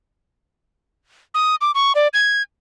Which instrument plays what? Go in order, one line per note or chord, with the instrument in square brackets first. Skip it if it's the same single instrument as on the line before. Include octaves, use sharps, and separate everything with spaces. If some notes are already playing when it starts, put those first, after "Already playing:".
[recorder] D#6
D6
C#6
D5
G#6